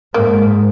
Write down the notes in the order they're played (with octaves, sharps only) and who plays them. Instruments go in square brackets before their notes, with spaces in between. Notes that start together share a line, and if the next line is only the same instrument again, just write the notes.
[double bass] G#2 [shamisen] A#3